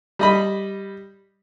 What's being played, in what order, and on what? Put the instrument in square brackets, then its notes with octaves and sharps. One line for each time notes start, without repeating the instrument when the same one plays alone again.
[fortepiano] G3 D#5 B5